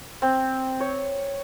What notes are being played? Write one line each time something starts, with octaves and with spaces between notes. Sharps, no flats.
C4
C#5